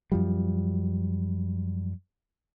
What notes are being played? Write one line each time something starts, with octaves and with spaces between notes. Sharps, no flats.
F#2 F3 G3